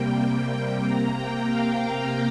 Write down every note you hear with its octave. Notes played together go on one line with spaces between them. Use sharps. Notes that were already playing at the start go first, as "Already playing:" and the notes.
Already playing: C3 G3 A#3 G5
C3 A#3 A#5
G5
F5